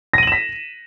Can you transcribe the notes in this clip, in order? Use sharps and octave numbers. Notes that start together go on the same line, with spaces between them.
A#6 B6 D#7 E7 F#7